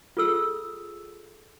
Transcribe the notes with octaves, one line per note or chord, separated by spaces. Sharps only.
F4 G#4 A4 E6